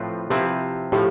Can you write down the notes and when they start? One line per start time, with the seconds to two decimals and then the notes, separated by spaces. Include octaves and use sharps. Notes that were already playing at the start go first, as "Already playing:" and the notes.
Already playing: A2 F3 C4 F4 B4
0.30 C3 F3 C4 E4 G4 B4
0.92 A2 F3 G4